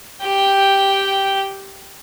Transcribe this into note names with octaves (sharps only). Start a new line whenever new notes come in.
G4 G5